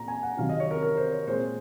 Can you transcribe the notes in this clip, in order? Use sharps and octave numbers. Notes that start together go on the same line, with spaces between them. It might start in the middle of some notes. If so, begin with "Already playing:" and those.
Already playing: A#2 A#5
G#5
F#5
C3 D#3 F#3 F5
D#5
C#5
A#4
A#4
C5
C#5
A#2 G#3 C4 C5